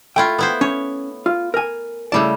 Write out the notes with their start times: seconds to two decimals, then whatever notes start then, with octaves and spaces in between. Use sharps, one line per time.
0.16 A3 E4 F4 G5
0.39 B3 E4 C5
0.61 C#4 C#5
1.26 F4
1.54 A#4 G#5
2.12 C#3 G3 A3 E4 D5 A5